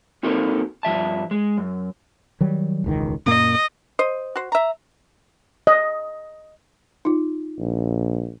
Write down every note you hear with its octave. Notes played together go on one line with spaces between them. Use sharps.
A#3 C4 D#4 F#4 A4 A#4
G2 F3 E5 A5
G#3
F#2
D#3 F#3 G3
E1 C#2 D#3
F#2 A#2 A#3 D#5
C5 D#5
F#4 C5
E5 A#5
D#5
D#4 F4
A#1